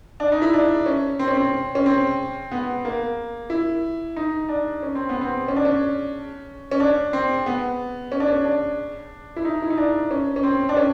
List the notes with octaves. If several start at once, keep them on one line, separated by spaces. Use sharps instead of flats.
D4
D#4
E4
D4
C#4
C4
C#4
C4
C#4
C4
B3
A#3
E4
D#4
D4
C#4
C4
B3
C4
C#4
D4
C#4
C#4
D4
C4
B3
C#4
D4
C#4
D4
E4
D#4
E4
D#4
D4
C#4
C#4
C4
D4
C#4